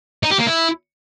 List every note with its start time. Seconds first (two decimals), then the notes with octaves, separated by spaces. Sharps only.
0.23 D#4
0.31 G4
0.39 A#3
0.47 E4